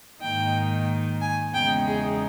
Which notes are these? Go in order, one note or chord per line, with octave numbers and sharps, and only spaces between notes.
G#2 D#3 A#3 D#4 G5
G#5
E2 C#3 G#3 B3 D#4 G5
G#4